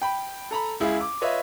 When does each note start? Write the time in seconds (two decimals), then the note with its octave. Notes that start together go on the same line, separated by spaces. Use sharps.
0.02 G5 B5
0.51 A4 A#5 B5
0.80 C#2 E4 G#4 F5
1.01 D6
1.21 F4 B4 C#5 D#5 E5